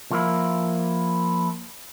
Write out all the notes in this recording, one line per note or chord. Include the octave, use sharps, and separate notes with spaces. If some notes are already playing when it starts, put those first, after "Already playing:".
F3 A#3 E4